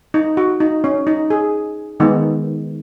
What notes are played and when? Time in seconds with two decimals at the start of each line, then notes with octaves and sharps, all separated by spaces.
0.14 D#4
0.37 F#4
0.60 D#4
0.84 C#4
1.07 D#4
1.30 G#4
2.00 D#3 G#3 B3 D#4